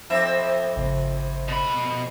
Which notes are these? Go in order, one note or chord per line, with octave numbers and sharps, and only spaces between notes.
F2 C4 E5
G#1 C#3
B2 B5